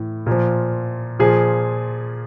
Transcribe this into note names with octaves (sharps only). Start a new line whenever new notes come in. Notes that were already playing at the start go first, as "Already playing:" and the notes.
Already playing: A2 E3
A#2 F3
A#2 F3 G#4